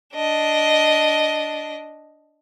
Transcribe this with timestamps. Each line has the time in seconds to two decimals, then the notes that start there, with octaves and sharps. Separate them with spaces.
0.14 D4 D#5